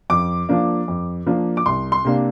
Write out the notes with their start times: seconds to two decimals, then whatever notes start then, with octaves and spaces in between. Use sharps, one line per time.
0.10 F2 D6
0.49 F3 A#3 D4
0.88 F2
1.26 F3 A#3 D4
1.57 D6
1.66 C2 C6
1.92 C6
2.05 C3 A#3 D4